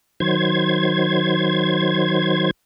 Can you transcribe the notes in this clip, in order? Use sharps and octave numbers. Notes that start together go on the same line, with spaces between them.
D#3 F#3 C5 G#6